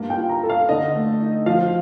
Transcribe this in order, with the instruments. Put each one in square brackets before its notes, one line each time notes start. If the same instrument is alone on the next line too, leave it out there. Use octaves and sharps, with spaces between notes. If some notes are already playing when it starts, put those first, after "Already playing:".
Already playing: [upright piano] G2 A#3
[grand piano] G5
[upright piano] F4
[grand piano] A#5
[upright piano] A4
[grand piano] F5
[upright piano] D3 [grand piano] D#5
[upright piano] A3
D#4
[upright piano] F3 [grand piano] F5